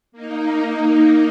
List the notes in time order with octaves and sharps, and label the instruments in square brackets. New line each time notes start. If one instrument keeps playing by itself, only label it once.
[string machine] A#3 D#4